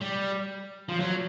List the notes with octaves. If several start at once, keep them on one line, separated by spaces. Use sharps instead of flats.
G3
F3
F#3